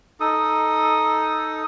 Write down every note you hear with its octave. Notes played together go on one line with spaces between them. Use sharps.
D#4 A4 D#6